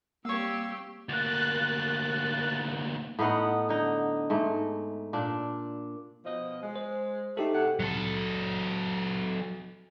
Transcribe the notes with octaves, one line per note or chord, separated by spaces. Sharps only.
G3 A#3 C4 G4 C#5 F5 E6
D2 A#3 F#6 A6
A2 B3 D#4 F#5
D3 D#4
G#2 A3
A#2 D4
B2 F3 D#5
G#3
C5
A3 D#4 G4 A4
C3 A3 F#5
F#3 A4